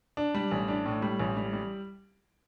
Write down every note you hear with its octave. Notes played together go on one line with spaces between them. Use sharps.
D4
G3
A1
D4
A2
G3
A1
G3
G3